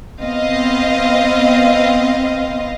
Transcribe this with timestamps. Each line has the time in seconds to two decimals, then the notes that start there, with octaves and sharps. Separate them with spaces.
0.22 B3 C4 D#5 F5